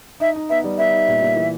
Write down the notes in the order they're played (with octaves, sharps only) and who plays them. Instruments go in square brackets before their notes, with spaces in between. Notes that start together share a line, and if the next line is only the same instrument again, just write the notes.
[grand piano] D#4 [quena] E5
[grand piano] D#4
[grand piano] B3 [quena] E5
[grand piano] G3
[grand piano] B3 [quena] E5
[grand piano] D#4
A#2
A#2
E3